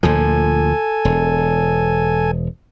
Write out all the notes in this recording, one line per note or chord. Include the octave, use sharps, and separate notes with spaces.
D2 A#2 F3 A4 G#5
E1